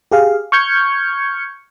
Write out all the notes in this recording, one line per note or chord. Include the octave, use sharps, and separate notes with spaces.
G4 G#4 F5
C#6 F6 G6 G#6 C#7